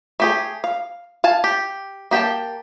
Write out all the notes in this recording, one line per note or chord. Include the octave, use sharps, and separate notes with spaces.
A3 G4 G#4
F5
F5 G#5 A5
G4
A#3 G4 B4 G5 A5